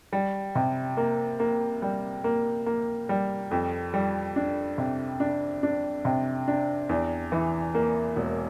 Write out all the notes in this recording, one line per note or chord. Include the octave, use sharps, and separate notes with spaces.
G3
C3
A#3
A#3
G3
A#3
A#3
G3
F2
G3
D4
C3
D4
D4
C3
D4
E2
E3
A#3
E1